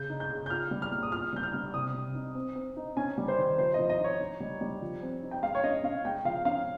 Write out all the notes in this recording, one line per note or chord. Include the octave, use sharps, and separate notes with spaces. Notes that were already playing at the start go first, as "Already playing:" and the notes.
Already playing: C#3 G6
D#4
G6
C#3
G6
F4 F6
G3
F6
A#2
D#6
F4 F6
G3 G6
F6
G3
C3 D#6
C3
D#4
C4
C4
D#4
C#4 G#5
G3
C5
D#3
F3 C5
F3 D#5
D#5
D#4
C#5
D#4
G3
G3
F3
C4
D#4
G5
G#3 F5
C#5
C#4 D#5
C#4 F5
G#3 G5
F3 F5
C#4 F5